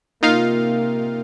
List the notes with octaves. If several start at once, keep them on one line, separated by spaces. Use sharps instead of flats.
C3 A#3 D#4 F4 F5